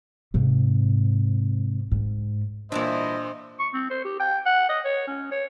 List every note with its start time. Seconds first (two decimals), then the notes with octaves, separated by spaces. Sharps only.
0.34 G#2 C3
1.91 G#2
2.72 A#2 E3 G3 D4 E4 C5 D#5
3.59 C#6
3.74 C4
3.90 C5
4.05 G4
4.20 G5
4.46 F#5
4.69 D#5
4.84 C#5
5.07 C#4
5.31 C#5